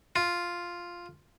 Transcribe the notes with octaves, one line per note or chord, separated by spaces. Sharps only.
F4